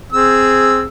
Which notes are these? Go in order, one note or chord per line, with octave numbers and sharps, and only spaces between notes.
C4 G#4 E6